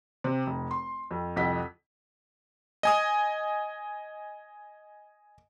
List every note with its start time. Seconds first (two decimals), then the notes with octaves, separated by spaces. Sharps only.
0.24 C3 C4
0.47 F1
0.71 C6
1.11 F2
1.36 C2 F2 D#5 F#5 B6
2.83 D#5 G#5 D#6